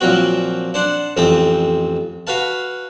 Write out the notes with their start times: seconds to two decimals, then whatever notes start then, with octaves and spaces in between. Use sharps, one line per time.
0.01 A#2 F3 F#3 C4 F#4
0.74 D4 C5 F#5
1.17 A1 F2 C4 A5 D#6
2.27 F#4 B4 F5 A5